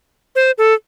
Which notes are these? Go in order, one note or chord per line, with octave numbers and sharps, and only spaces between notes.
C5
A4